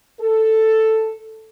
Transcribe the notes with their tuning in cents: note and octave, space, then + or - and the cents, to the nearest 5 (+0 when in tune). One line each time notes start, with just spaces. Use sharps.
A4 +5